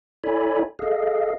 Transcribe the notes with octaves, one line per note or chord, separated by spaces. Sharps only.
E4 A4 C#5 D5 G#5 B5
G#4 A4 D#5 F5